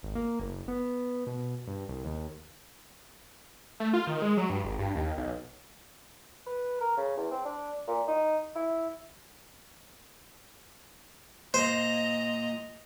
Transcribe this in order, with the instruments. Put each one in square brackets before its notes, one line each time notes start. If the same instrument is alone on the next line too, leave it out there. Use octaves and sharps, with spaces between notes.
[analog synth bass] G#1
A#3
F#1
B3
B2
G2
C2
D#2
[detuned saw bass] A3
F4
D#3
G#3
F#3
G2
G#1
G2
D#2
B1
[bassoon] B4
A#4
C#3
E2
C4
D4
A#2
D#4
E4
[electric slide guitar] A#2 [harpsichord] C5 [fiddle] D#5 A#5